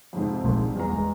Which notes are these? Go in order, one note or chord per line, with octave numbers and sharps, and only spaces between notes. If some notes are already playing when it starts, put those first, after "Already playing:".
F2 G#2 C3
A#1 G#3 A3
G3
E2 A#5
G#3